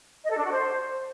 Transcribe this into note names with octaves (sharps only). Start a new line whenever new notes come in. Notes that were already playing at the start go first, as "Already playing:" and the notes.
D#5
A4
D4
F#4
C5